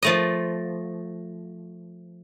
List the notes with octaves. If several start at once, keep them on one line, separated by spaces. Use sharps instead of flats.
F3 A3 D#5